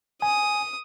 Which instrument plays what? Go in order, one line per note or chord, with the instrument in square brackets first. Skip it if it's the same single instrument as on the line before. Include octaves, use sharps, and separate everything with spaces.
[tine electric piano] G#5 [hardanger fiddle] D#6